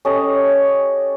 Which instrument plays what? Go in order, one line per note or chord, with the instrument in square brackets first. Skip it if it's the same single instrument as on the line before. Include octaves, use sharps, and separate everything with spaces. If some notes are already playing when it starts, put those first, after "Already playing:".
[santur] C#4 G4 A4 D#5